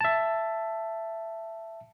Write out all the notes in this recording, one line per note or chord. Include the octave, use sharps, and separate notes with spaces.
E5 A5